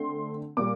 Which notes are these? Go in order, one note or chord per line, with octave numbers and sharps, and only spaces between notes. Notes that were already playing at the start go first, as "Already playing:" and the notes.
Already playing: D3 A3 C4 C6
A#2 G3 D6